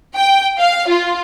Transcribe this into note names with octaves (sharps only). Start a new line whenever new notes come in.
G5
F5
F4